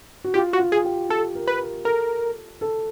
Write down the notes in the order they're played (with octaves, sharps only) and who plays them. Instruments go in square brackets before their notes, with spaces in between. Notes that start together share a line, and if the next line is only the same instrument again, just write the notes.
[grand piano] F#4
[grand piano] F4 [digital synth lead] G4
[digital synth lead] F#4
[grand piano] F4
[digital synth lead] G#4
[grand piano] G4
[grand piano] G4 [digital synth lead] A4
[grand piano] A#4
[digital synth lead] B4
[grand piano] A#4
[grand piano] A4 [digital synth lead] A#4
[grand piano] A4